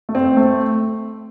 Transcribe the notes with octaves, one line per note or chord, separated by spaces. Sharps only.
A3
C4
A3